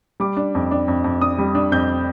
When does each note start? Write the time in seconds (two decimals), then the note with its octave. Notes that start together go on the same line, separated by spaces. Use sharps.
0.20 G3 D6
0.37 D4
0.55 F2
0.71 D4
0.88 F2
1.04 F2
1.21 D4 D#6
1.38 G3
1.55 D4
1.72 F2 G6